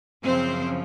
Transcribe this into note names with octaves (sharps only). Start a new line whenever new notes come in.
F#2 C#3 F3 C4 C5